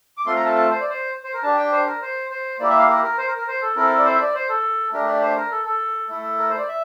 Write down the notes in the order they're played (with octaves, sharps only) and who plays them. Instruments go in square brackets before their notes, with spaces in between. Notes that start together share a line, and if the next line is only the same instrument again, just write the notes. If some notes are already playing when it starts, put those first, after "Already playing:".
[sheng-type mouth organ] D6
A3 C4 F4 A4 C6
A#5
A5
A5
C5
D5
C5
C5
A#4
D4 G4 A5
G5
C5
A#4
C5
C5
A#3 E4 G4 D5
E5
F5
A#4
A#4
C5
A#4
A#4
C5
A4
C4 E4 A4 A#4
D5
C5
E5
D5
C5
A4
A3 D4 G4 A#4
D5
C5
A#4
A4
A4
A3 E4 A4
A#4
C5
D5
E5